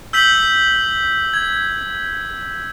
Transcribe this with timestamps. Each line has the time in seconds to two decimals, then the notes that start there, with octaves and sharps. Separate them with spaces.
0.13 E6 G6 B6 F#7
1.33 G#6